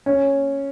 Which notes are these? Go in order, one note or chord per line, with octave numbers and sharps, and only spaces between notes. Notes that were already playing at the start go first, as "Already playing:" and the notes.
C#4